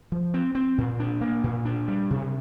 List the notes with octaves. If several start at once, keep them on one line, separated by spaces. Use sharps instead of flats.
F3
C4
C4
A#2
D4
A#3
A#2
D4
G3
C3